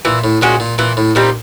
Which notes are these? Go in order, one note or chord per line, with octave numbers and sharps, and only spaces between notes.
A#2 E3
A2
A#2 G#3 C#4 F#4
A#2
A#2 E3
A2
A#2 G3 C4 D#4